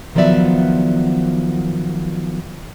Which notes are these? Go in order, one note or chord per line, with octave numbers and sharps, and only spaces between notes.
D#3 F3 F#3 B3 D5 E5